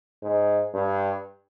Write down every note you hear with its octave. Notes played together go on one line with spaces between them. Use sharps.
G#2
G2